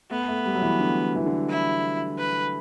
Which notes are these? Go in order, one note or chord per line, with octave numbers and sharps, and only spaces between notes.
A3 B3
A3
G3
F#3
E3
D3
E3
D3
E4
B4